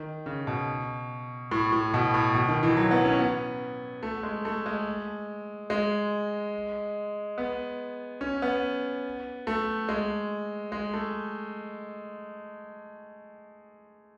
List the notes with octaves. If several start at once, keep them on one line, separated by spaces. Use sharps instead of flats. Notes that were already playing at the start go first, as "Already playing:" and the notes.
Already playing: D#3
C#3
B2
A2
A2
B2
A2
B2
D#3
E3
F#3
B3
C#4
B3
A3
G#3
A3
G#3
G#3
B3
C#4
B3
A3
G#3
G#3
A3